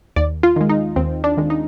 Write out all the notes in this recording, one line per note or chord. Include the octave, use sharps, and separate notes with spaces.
D#2 D5
F4
D#3 G#3
D#4
D#2 C4
D4
D#3 G#3
D#4